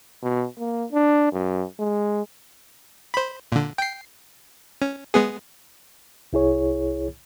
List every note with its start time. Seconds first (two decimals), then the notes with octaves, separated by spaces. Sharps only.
0.23 B2
0.59 A#3
0.93 D4
1.32 F#2
1.79 G#3
3.14 C5 B5
3.52 A#2 D3
3.78 G5 C7
4.82 C#4
5.14 G#3 B3 G#4
6.33 C2 E4 G#4 C#5